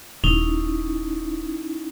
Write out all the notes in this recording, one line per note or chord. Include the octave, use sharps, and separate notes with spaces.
D#1 C#4 D#4 E4